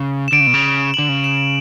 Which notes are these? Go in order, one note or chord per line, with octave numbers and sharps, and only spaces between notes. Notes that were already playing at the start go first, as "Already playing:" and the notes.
Already playing: C#3
E7
D3 D7
C#3
B2
C#3
D3 F#7
C#3
E7